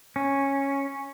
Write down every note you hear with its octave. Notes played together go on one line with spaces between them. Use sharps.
C#4